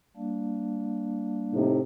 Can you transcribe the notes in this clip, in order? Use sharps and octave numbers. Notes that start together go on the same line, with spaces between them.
G3 A#3 D4
A2 C3 D#4